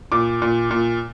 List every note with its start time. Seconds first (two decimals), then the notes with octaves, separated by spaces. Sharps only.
0.12 A#2 D6
0.42 A#2
0.71 A#2